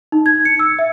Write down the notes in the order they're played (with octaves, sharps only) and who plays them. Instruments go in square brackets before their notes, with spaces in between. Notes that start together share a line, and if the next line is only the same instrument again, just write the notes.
[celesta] D#4
G#6
C#7
E6
E5